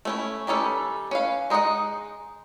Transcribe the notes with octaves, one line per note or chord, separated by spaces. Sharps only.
A3 C#4 E4
D#3 G3 C#4 A4 B4
C#4 B4 F5
G#3 D#4 G#4 D#5 F#5